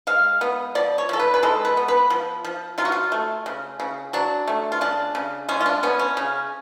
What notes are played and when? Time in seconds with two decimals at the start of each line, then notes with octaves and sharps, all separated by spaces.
0.07 G#3 F5
0.41 B3
0.75 F3 D5
0.98 C#5
1.09 F3 A4
1.20 B4
1.34 B4
1.43 G#3 A4
1.65 B4
1.77 B3
1.88 B4
2.10 F3
2.45 F3
2.78 F#3 F4
2.85 F#4
2.92 F4
3.12 A3
3.46 C#3
3.80 C#3
4.13 F#3 D4
4.48 A3
4.72 F4
4.81 C#3 D4
5.15 C#3
5.49 G#3 C#4
5.61 F4
5.66 D4
5.83 B3 C#4
5.99 C#4
6.17 C#3